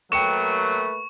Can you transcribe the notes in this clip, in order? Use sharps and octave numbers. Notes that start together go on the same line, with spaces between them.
F#3 A3 A#3 B4 G5 C#6 C#7 E7